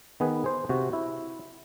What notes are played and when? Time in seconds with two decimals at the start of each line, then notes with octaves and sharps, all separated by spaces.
0.20 D#3 B3 G#4 B4
0.44 G#4 C5
0.69 C3 F#4
0.93 E4